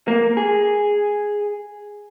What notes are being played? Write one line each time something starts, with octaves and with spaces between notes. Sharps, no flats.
A#3
G#4